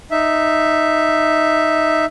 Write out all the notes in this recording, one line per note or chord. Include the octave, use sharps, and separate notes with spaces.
D#4 E5